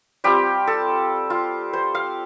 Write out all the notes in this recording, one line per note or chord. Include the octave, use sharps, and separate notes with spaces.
G3 C4 F4 G4
A4
F4
C5
F5